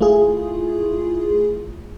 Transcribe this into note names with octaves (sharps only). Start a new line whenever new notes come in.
A3 E4 F4 G#4